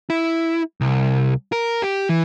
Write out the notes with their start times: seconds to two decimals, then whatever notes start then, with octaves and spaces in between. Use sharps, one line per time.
0.10 E4
0.81 C2
1.52 A#4
1.82 G4
2.09 E3